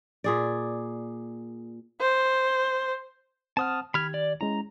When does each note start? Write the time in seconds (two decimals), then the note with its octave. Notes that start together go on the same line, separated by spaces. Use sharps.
0.24 A#2 G#4 D5
2.01 C5
3.57 C4 C5 F#5 A5 D#6 F6
3.94 D#3 G4 B5 F6 G#6
4.14 D5
4.41 G#3 C#4 E4 A#5